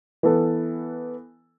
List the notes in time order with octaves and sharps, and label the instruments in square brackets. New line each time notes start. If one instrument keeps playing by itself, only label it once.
[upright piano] E3 B3 A4